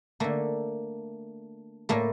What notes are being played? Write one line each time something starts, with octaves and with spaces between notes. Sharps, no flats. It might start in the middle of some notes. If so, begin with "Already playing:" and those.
D3 A3 A#3
A2 A3 A#3